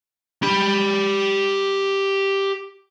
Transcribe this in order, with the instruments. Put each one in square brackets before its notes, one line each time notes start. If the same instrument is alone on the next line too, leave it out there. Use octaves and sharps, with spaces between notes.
[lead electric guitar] G4 B5